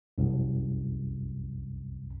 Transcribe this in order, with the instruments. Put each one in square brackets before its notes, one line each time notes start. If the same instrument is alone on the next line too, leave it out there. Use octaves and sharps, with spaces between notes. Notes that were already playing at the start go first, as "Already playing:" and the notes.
[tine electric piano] C2 F#2